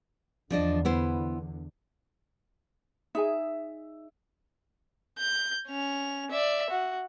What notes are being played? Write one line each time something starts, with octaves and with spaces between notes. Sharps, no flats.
E2 D3 F3 D4 D#5
B3 E4 C5
D#4 G#4 E5 G#5
G6
C#4 F7
D5 E5
F#4